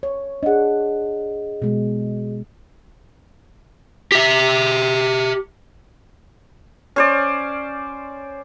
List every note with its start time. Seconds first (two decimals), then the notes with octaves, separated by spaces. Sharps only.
0.03 C#5
0.43 D4 G#4 D#5 F#5
1.62 B2 G#3
4.12 G4 E5
6.96 C#4 C5 D5